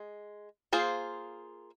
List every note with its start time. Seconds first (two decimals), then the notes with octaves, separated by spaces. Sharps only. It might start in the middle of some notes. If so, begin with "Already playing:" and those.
Already playing: G#3
0.73 A#3 F4 G#4 C5